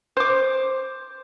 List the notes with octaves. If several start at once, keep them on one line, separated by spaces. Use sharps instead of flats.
C5 D6